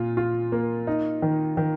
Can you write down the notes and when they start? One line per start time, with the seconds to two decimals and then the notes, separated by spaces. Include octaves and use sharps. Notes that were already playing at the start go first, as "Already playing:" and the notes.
Already playing: A#2 F4
0.17 F4
0.52 A#3
0.87 D#4
1.22 D#3
1.57 D#3